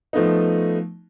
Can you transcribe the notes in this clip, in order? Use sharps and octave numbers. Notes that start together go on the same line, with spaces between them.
F3 A3 B3 D#4